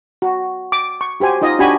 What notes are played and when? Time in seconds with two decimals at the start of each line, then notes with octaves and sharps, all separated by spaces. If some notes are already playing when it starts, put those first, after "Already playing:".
0.22 F#4
0.72 D6
1.01 C#6
1.20 F#4 G4 C5 G#5
1.41 D#4 F4 D#5
1.59 D4 F#4 G4 G#5 B5